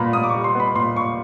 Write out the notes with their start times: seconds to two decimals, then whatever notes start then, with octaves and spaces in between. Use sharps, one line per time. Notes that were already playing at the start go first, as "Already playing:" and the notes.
Already playing: A#2 G3 B3 A#5 B5
0.13 A#2 D#6
0.23 D6
0.29 C#6
0.34 G3
0.44 C6
0.55 B3 B5
0.75 A#2 C6
0.96 A#2 C#6